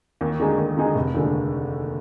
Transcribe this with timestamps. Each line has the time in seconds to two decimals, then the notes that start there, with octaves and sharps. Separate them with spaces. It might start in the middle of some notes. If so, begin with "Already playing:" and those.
0.21 D#2
0.40 D3 G#3 D#4 G#4
0.58 D#2
0.77 D3 G#3 D#4 G#4
0.95 F1
1.14 D#2 D3 G#3